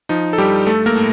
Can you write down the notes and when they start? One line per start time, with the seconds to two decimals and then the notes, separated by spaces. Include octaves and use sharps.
0.09 F3 D#4
0.33 A4
0.38 G2 G3 G4
0.67 A3 A4
0.86 A#3 A#4
0.96 A2